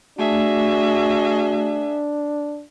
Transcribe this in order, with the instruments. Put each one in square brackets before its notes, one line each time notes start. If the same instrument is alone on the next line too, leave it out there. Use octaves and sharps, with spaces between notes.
[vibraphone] A3 [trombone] D4 [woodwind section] F#4 [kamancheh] G#4 E5